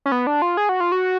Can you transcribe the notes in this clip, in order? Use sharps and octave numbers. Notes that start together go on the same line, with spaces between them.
C#4
B3
D4
F4
G#4
F#4
F4
F#4